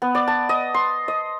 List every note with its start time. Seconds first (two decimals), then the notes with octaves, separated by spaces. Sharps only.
0.02 B3
0.15 D5
0.28 A5
0.49 D#5
0.74 C6
1.08 D#5